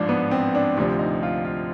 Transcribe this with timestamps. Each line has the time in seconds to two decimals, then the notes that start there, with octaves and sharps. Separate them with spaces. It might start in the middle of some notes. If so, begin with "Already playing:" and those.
Already playing: A1 G#2 F3 D4
0.09 B3
0.31 C4
0.55 D4
0.77 D2 C3 F3 D4
0.99 D#4
1.23 F4
1.45 F4